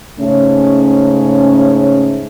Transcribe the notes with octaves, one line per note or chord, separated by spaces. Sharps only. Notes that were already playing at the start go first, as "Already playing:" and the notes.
G#2 C#3 A3 C#4